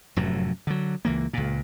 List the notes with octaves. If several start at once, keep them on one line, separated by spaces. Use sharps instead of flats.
F1 F#2 A2 F#3
D3 F#3
C#2 E3 A#3
C#2 A#2